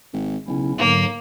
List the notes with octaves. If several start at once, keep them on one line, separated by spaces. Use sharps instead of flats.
G#1
B1 C#3 C#4 E4
G#2 D3 F#3 A#3